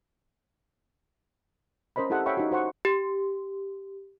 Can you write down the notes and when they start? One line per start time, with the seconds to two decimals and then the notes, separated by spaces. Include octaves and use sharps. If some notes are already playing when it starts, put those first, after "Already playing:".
1.96 C#4 A#4 C5 D#5 B5
2.10 E4 G4 A4 D#5 F#5
2.26 C#5 E5 F5 G5 B5 C#6
2.37 D#4 F#4
2.51 F#4 C5 F#5 C#6
2.85 G4